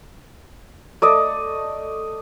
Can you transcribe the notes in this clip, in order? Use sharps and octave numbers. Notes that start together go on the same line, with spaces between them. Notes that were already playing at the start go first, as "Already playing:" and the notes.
A3 D5 D#5